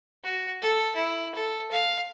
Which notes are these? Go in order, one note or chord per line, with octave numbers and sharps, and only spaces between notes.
F#4
A4
E4
A4
F5